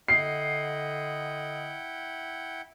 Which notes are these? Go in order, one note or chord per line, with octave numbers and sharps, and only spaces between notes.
D3 E4 D#5 F#5 G5 C7